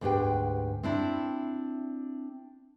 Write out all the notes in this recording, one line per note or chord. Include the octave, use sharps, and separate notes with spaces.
D2 G#2 D4 G4 B4 G5
C4 D4 E4 D5